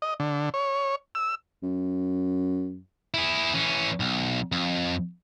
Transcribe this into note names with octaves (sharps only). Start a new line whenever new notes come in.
D#5
D3
C#5
E6
F#2
E4 G#4
E3 C#4
B1
F2